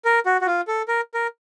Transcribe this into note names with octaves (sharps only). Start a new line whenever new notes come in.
A#4
F#4
F#4
F4
A4
A#4
A#4